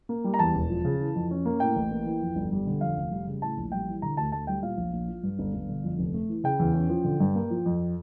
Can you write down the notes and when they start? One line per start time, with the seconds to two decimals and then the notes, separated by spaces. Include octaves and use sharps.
0.09 A#3
0.24 G3
0.34 A#5
0.39 E2 A5
0.55 E1
0.70 F3
0.85 C#3
1.00 E3
1.15 F2
1.31 C#4
1.45 A#3
1.60 A2 G5
1.76 A1
1.91 A#3
2.05 E3
2.22 F2
2.36 G1
2.52 G3
2.67 D3
2.81 F2 F5
2.97 F1
3.11 G3
3.27 C#3
3.42 A2 A5
3.58 A#1
3.72 G3 G5
3.88 E3
4.02 D3 A#5
4.17 D2 A5
4.32 D2 A5
4.47 G3 G5
4.62 A#2 F5
4.77 A#1
4.93 A#1
5.08 F3
5.23 G2
5.39 G1
5.54 G1
5.69 D3
5.84 F2
5.99 F1
6.14 A3
6.29 E3
6.44 C#3 G5
6.59 E2
6.74 C#4
6.89 F3
7.05 D3
7.20 G2
7.35 A#3
7.50 F3
7.66 F2